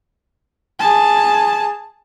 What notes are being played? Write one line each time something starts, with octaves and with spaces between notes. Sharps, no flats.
G#4 A5